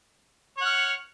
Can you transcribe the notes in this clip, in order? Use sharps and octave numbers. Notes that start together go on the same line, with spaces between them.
C#5 F#5 F6